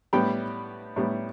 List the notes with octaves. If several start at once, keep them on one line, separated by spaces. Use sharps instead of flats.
A2 G3 B3 G5 B5
A2 G3 B3